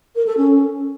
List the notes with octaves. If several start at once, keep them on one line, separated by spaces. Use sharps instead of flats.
A#4
A4
C#4